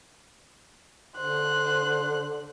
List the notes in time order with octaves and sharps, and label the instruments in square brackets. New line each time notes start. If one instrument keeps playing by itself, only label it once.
[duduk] D3 [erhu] C5 [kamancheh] F#6